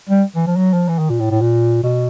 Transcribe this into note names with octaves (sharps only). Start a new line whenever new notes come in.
G3
E3
F3
F#3
F3
E3
D#3
A#2
A2
A2
A#2
B2